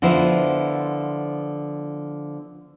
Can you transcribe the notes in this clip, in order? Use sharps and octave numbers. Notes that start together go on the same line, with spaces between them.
D3 F3 B3 E4 C5